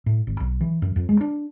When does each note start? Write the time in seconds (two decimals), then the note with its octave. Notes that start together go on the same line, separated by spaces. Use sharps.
0.06 A2
0.27 G#1
0.40 B1
0.61 E3
0.82 F#2
0.96 F2
1.09 G#3
1.21 D4